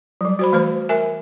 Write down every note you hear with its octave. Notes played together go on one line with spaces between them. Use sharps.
F#3 G3
F#4 C5 B5
E3 A3 B4 C5
A#4 E5 G#5